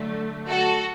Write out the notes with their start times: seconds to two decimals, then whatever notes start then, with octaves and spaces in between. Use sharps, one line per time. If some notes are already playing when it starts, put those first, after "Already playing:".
Already playing: D3 F#3 A3
0.48 F#4 A4